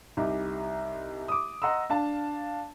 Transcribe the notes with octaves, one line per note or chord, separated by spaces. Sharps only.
C2 D#4 G4
D6 D#6
D#5 F#5 A#5 C6 E6
D4 F5 A5